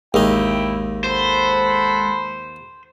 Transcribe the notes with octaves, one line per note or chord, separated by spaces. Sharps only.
A1 D#2 G#3 D#4 E4 G5
A4 C5 F#5 B5